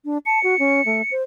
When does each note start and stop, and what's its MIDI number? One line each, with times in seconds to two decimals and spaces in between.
0.05 0.18 62
0.26 0.39 81
0.26 1.13 97
0.44 0.57 66
0.59 0.84 61
0.85 1.02 57
1.11 1.23 72